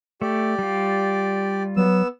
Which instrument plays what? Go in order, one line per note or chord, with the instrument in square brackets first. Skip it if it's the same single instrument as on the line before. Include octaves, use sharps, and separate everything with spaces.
[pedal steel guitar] A3 [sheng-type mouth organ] G4 D5
[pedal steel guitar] G3 F4
[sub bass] F#3 [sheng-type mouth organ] B3 E6